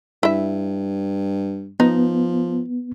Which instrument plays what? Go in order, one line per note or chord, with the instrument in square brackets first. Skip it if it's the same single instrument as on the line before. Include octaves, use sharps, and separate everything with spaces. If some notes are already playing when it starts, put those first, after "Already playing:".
[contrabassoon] G2 [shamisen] E4 E5
[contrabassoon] F3 [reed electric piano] B3 [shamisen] D#4